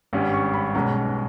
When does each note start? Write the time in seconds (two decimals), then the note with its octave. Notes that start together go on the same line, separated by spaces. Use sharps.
0.13 G#1 G2 G3 C#4
0.33 C#6
0.54 B5
0.75 B1 B2 G#3 C#4 A#5